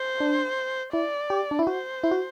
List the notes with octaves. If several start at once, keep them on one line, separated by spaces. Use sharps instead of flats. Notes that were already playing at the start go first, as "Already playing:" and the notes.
Already playing: C5
D4
E4 D5
G4
D4
E4
F#4 C5
E4
F#4